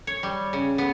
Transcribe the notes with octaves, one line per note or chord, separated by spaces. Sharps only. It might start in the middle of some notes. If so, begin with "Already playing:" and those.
C#5
G3
C#3
B3